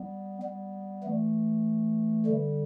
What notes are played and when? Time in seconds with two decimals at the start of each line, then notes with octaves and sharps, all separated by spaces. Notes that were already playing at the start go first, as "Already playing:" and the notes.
Already playing: G3 B3
0.42 G3 B3
1.03 E3 A3
2.26 D3 G3